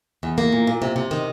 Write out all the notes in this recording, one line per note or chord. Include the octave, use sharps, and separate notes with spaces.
E2
A#3
A#2
A#2
C3
C3
D#3